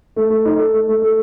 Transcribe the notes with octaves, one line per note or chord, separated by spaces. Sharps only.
A3
A3
D#4
A4
A3
A3
A3